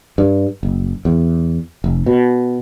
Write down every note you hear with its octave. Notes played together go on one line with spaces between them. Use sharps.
G2
F#1
E2
F1
B2